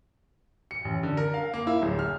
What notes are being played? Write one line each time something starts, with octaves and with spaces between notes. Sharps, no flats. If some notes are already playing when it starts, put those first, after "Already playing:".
C#7
A1
D3
A#4
F5
A#3
E4
D1
F6